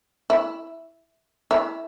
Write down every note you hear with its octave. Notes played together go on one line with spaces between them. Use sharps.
E4
E4